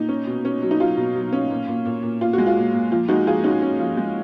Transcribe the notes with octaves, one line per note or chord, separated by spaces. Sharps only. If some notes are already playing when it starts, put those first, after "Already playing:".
Already playing: A#2 D#4
C#4
B2
C#4
F#3
D#4
F#3 F4
B2
F#3
C#4
A#2
A#2
A#2
A#2
A#2 F4
G#3 F#4
F4
A#2
A#2
F3 F4
G#3 D#4 F#4
F3 F4 G#4
C#4 D#4 F#4
C#4
F3
G#3